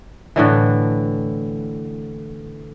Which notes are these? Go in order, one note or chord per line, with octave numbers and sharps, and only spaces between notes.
A2 D3 E3